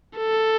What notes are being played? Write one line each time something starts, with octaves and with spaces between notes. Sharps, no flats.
A4